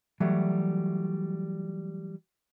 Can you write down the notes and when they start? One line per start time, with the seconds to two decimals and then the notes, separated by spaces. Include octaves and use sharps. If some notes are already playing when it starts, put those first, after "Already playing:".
0.20 E3 F#3 G3 A3